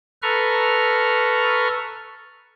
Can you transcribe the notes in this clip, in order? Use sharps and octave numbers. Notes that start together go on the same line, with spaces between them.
A4 B4 A#5 C#6 F6